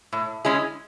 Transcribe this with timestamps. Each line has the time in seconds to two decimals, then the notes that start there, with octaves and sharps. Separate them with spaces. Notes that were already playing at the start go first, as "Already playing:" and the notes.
0.13 A2
0.45 G#3 C#4 E4 G#4